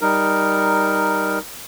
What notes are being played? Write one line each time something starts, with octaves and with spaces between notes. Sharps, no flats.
G3 D#4 A#4